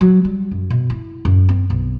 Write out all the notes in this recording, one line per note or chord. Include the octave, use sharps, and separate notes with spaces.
F#3
G3
F#2
B2
E4
F#2
C4
B1